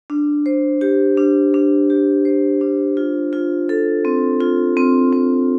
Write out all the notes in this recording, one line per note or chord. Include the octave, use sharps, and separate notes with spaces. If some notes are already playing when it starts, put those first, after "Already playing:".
D4
C5
G4
D4
D4
G4
C5
D4
F4
F4
A4
C4
F4
C4
C4